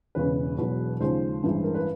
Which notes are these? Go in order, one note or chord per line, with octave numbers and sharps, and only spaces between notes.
E1 E2 C#3 B4
E1 E2 B2 F#3
D#2 C#3 F3 G#3 C5
A1 G2 E3 G#3
A#4
B4